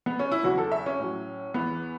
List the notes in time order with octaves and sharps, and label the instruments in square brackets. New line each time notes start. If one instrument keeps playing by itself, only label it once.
[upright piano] B3
C#4
E4
E2 C#3 F#3 F#4
A4
E5
C#4
A2 F#3
E2 E3 B3